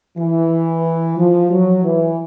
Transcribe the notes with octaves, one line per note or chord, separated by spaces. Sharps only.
E3
F3
F#3
E3